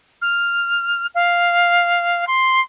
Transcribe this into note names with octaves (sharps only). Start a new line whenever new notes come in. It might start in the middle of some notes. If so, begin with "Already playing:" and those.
F6
F5
C6